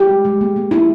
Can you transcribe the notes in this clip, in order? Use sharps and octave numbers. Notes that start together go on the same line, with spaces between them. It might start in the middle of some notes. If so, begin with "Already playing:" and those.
Already playing: G4
G#3
G#3
A#3
A#3
G#3 E4